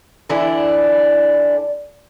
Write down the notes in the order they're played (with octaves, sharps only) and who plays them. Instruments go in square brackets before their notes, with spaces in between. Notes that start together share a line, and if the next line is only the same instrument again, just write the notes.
[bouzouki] D3 E3 D4 E4